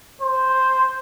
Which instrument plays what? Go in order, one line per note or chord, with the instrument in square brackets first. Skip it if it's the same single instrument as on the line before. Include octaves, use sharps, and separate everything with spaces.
[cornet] C5